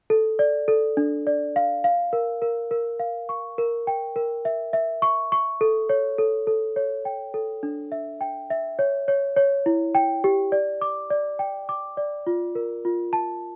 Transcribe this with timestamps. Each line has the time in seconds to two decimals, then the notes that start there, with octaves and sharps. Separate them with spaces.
0.10 A4
0.39 D5
0.68 A4
0.97 D4
1.27 D5
1.56 F5
1.84 F5
2.13 A#4
2.42 A#4
2.71 A#4
3.00 F5
3.29 C#6
3.58 A#4
3.87 G5
4.16 A#4
4.45 E5
4.73 E5
5.02 C#6
5.32 C#6
5.61 A4
5.89 C#5
6.18 A4
6.47 A4
6.76 C#5
7.05 G5
7.34 A4
7.63 D4
7.92 E5
8.21 G5
8.50 E5
8.79 C#5
9.08 C#5
9.37 C#5
9.66 E4
9.95 G5
10.24 G4
10.52 D5
10.81 D6
11.10 D5
11.39 G5
11.69 D6
11.97 D5
12.27 F4
12.55 A#4
12.85 F4
13.13 A5